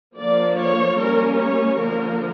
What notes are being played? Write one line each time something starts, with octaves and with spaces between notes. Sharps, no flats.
D3 F3 A#3 D5
C#5
G3 A#3 C#4 A#4
C#5
D3 F3 A#3 A#4